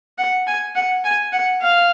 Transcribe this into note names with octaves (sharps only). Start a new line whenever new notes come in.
F#5
G#5
F#5
G#5
F#5
F5